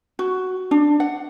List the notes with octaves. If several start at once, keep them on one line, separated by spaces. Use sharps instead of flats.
F#4
D4
F#5